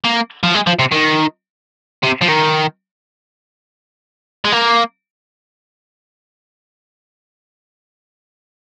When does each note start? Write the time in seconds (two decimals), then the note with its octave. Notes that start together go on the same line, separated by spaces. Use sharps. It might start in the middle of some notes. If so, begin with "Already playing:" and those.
0.05 A#3
0.43 F3
0.54 G#3
0.67 F3
0.79 C3
0.92 D#3
2.03 C3
2.22 F3
2.28 D#3
4.45 G#3
4.52 A#3